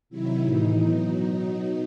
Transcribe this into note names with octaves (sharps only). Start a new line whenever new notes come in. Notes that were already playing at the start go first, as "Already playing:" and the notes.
C3 D#3 F#3 E4
A2 E3 D#4
B2 F#3 D#4